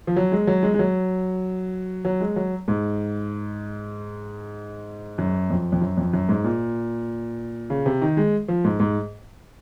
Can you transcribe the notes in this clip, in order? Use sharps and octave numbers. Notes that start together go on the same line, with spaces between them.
F3
F#3
G#3
F#3
G#3
G#3
F#3
F#3
G#3
F#3
G#2
F#2
F2
F2
F#2
F2
F#2
G#2
A#2
C#3
C3
D#3
G#3
F3
G#2
G#2